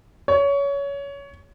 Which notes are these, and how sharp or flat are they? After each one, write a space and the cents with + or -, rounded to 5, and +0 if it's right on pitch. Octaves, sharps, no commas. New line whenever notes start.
C#5 +20